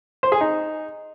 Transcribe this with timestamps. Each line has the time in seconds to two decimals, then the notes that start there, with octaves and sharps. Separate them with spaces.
0.23 C5
0.32 G#4
0.41 D#4